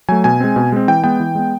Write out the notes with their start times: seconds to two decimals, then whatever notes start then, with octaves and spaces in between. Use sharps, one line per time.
0.09 F#3 A3 G#5
0.24 B2 G#5
0.40 G#3 C4
0.56 B2
0.72 G#3 C4
0.88 E3 G5
1.04 G#3 B3 G5
1.20 E3
1.35 G#3 B3